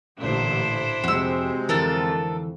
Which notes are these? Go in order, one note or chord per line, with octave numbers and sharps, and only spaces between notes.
A1 A#2 D3 D4 E4 C5
F2 C3 G#3 C4 F#4 E6
F2 D3 E3 D4 A4 A#4